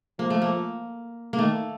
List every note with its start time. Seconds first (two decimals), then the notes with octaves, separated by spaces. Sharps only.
0.19 F3 A#3
0.30 A3
0.42 A#3
1.33 A#3
1.38 D#3 A3